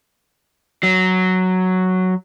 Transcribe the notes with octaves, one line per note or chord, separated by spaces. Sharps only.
F#3